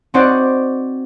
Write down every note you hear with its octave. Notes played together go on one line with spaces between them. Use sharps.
C4 D#4 F#4 C5 D5 F#5